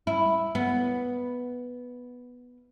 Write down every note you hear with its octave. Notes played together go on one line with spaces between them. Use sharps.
E4
B3